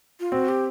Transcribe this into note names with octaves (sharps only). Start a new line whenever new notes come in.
F4
C4 F#4
G4